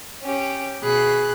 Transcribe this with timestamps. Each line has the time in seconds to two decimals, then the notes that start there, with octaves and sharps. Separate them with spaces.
0.23 C#4 G4
0.84 B2 G#4 B5 F#6